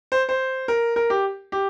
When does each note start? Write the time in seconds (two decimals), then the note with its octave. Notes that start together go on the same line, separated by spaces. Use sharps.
0.12 C5
0.29 C5
0.68 A#4
0.96 A#4
1.10 G4
1.52 G4